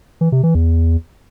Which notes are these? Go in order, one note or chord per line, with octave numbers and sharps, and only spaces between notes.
E3
C3
E3
E2